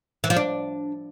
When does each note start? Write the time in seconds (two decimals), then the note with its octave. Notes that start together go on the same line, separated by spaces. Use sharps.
0.24 E3
0.30 F3
0.36 D4